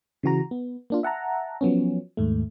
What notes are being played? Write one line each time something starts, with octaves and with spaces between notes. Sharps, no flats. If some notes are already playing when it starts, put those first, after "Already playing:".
C#3 E3 F#4 A#5
B3
A#3 D4 F4
E5 F#5 A5 A#5
F3 F#3 B3 C#4
D#2 G#2 A3